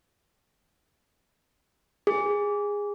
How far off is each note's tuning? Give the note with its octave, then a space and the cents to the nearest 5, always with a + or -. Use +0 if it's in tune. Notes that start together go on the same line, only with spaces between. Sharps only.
G#4 -15